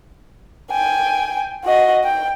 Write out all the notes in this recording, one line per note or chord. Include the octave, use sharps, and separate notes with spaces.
G5 G#5
F#4 D#5
G5